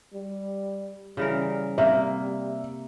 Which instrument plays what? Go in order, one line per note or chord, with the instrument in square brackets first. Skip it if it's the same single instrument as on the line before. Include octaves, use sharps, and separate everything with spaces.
[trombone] G3
[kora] C#3 E3 A#4 [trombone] G3
[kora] C3 A#3 [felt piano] E5